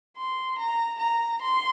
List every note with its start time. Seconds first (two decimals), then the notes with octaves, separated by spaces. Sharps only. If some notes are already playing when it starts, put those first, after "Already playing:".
0.17 C6
0.59 A#5
0.99 A#5
1.42 C6